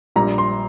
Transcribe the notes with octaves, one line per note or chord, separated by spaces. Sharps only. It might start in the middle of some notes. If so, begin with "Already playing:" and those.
A#1 A#2 G3 A#5
C6